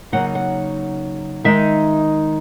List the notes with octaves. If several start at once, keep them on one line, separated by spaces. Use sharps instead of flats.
C#3 F#3 A#3 D#4 F#5
F#5
D#3 G#3 D#4 E5